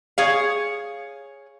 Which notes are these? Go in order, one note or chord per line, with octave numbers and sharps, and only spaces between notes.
G#4 C#5 F5